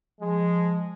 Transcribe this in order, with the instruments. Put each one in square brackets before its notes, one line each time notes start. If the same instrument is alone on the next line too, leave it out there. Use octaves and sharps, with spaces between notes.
[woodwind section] F3 [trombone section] G#3